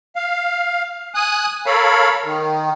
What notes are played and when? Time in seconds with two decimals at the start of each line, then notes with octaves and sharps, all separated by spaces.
0.16 F5
1.15 G#5 D#6 F#6
1.66 A4 A#4 C#5 F5 B5
2.24 D#3